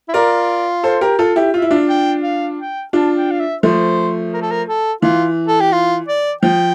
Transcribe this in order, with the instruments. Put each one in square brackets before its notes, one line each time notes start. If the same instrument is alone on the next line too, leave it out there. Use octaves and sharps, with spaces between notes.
[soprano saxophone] E4
[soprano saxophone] F4 [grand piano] A#4 D5
[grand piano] A4 C5
G4 A#4
F4 A4
E4 G4
[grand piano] F4 [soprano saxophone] E5
[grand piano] E4
D4 F4
[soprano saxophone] G5
F5
G5
[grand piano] D4 F4 [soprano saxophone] A5
[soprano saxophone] G5
F5
E5
[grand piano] F3 A3 [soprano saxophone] C5
[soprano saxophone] A#4
A4
A#4
A4
[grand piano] E3 [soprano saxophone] F4
[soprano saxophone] A4
G4
F4
D5
[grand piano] F3 [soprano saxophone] G5